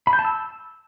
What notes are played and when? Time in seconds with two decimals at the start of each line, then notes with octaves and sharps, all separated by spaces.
0.07 B5
0.13 G6
0.19 A5
0.25 E6